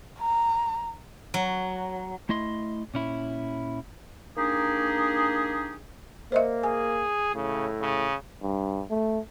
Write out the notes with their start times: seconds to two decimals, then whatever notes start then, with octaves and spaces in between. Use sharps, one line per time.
0.19 A#5
1.34 F#3
2.29 A3 E4 D#5 C6
2.94 A#2 C#4 E4
4.37 A#3 D4 D#4 G4 G#4
6.32 A#3 C5 D#5 E5
6.63 G#4 G#5
7.35 A2 C#3
7.81 C#3
8.43 G2
8.90 A3